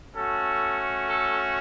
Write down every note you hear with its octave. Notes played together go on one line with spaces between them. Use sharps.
A3 C#4 F#4 A4
A4